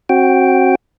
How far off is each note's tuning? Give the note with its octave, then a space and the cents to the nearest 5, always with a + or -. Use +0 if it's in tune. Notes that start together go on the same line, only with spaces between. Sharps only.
C4 +35 F#4 +0 G5 +0